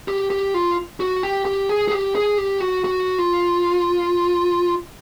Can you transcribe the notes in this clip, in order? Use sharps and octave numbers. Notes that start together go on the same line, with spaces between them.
G4
G4
F4
F#4
G4
G4
G#4
G#4
G4
G#4
G4
F#4
F#4
F4